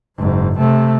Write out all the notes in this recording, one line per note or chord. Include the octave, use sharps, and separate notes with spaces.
F#1 G#2
C3 A3